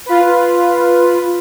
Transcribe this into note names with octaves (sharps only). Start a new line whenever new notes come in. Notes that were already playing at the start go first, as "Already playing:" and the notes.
F4 B4